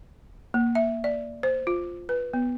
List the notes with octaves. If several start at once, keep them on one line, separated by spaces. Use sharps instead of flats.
A#3
E5
D5
C5
F4
B4
B3